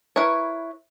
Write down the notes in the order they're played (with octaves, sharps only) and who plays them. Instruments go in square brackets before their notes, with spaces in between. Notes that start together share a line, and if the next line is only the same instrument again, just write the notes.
[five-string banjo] E4 A#4 B4 C#5